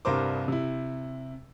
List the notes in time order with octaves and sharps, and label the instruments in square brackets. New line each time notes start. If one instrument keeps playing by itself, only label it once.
[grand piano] C2 G2 A#4 C5 D6
C3 E4